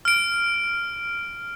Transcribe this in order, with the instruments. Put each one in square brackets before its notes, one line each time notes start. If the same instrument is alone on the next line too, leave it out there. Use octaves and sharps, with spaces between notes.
[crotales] F6 D7